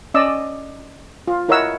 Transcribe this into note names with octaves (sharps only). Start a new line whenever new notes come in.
C#4 D5 D#5 E6
F4
E4 A#4 C#5 D#5 F#5 E6